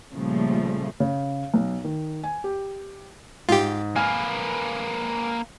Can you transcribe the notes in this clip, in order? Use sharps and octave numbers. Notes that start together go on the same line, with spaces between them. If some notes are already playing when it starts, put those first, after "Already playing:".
A#2 C#3 F3 G3 A3
C#3
B1
D#3
G#5
G4
G#2 F4 G4
A#3 B4 G#5 F6